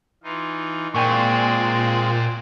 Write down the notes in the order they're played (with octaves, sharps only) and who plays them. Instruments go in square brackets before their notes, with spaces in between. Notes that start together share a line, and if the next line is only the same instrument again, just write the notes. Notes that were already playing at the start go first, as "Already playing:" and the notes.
[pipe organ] E3 D#4 F4
[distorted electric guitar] A#2 [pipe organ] G#3 C4 D5 [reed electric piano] G5 G#5 C#6